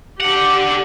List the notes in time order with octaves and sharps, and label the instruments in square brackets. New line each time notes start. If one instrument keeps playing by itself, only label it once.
[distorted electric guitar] D3 F#5 [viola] G4